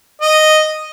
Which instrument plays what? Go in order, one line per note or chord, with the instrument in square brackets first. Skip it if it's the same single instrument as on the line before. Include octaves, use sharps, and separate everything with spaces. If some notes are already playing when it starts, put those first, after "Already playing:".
[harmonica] D#5